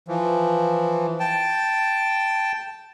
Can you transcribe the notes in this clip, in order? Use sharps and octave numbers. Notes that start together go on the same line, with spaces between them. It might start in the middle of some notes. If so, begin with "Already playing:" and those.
E3 F3
G5 A5